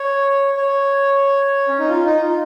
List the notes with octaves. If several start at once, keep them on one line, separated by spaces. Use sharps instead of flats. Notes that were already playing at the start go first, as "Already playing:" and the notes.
Already playing: C#5
C#5
C#4
D#4
F4
D#4
F4